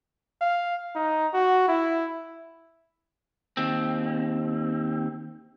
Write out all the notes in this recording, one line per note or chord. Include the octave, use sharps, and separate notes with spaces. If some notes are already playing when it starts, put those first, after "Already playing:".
F5
D#4
F#4
E4
D#2 C4